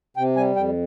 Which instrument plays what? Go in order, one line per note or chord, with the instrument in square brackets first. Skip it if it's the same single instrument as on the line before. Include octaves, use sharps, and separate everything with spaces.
[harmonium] C3 G5
G3 G#5
F2 G5